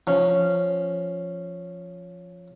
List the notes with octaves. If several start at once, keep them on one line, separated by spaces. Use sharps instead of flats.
F3 C#4